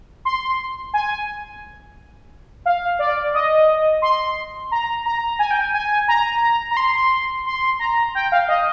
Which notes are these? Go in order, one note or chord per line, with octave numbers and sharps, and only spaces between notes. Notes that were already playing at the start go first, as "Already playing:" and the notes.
C6
G#5
F5
D5
D#5
C6
A#5
A#5
G#5
G5
G#5
G#5
A#5
A#5
C6
C6
A#5
G5
F5
D#5